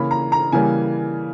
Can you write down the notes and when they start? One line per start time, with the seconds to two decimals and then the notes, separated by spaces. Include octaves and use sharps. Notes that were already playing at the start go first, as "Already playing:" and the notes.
Already playing: C#3 E3 A#3 B5
0.11 A#5
0.32 A#5
0.52 C#3 E3 G3 A#3 G#5